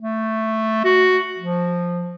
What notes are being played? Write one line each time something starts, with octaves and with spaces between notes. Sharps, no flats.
A3
F#4
F3